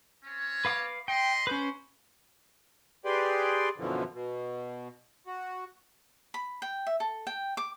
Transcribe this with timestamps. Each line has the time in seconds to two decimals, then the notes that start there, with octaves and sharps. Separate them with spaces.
0.24 C4 C#4 C#5
0.65 B4 F5 D6
1.08 D#5 G5 B5 C6
1.47 C#4 B4 C5
3.05 G4 G#4 B4 D5 G5 C6
3.78 F#2 B2 D3 E3 F3
4.13 B2
5.27 F#4
6.34 B5
6.62 G5
6.87 E5
7.00 A4
7.27 G5
7.57 D6